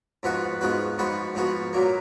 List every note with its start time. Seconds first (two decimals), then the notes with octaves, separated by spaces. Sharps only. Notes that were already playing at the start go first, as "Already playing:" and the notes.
0.23 G#2 F3 B3 F#4 B4
0.61 G#2 F3 B3 F#4 B4
0.98 G#2 F3 B3 F#4 B4
1.35 G#2 F3 B3 F#4 B4
1.73 A#2 F#3 A#3